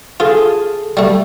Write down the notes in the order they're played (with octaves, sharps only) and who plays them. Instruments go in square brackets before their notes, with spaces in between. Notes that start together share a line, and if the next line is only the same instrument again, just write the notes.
[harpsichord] F4 [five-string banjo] G#4 A4
[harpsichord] G3 A3